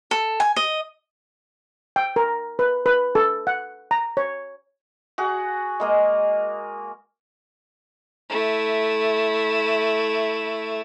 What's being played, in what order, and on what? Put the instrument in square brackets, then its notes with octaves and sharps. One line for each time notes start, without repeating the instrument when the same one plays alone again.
[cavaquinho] A4
G#5
D#5
[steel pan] G5
A#4
B4
B4
A4
F#5
A#5
C#5
[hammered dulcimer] F#4 G#4 F#5
G#3 A#3 D#5
[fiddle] A3 E4